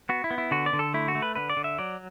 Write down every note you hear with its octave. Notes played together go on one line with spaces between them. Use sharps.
B3 F#4
E4
B3
E4
D3 F#4
D5
D3
A4
A3 E4
F#4
A3
B4
D3 B4
D5
D3
E5
F#3 D5